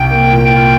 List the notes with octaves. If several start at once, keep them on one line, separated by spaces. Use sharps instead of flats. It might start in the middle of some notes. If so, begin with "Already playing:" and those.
Already playing: C2 G5
A#3
A#2
F4